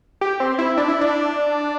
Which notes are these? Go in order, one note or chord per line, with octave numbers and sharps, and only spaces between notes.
G4
C4
E4
D4
E4
D4